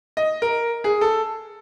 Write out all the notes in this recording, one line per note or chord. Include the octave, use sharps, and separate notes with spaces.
D#5
A#4
G#4
A4